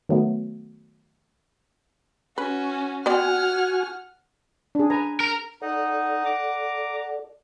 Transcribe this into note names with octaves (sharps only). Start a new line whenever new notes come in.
D#3 F#3 A3 B3
C#4 F#4 B4
B3 C4 F#4 D5 F#5 G#5 F6
D4 G#4
B4 G#5 A#5
A#4
D#4 A4 D5 F#5
A#5 D6